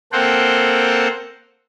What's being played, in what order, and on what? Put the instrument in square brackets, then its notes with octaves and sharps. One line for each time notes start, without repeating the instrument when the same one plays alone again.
[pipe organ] A#3 C4 A4 C5 F#5 G5